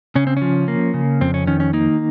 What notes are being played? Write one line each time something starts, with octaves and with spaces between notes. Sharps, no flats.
C#3 C#4
C4
C#4
F3
A#3
C#3
F2 C4
C#4
D#3 C#4
C#4
A#3 D#4